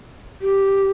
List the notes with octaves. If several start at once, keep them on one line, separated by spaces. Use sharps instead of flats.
G4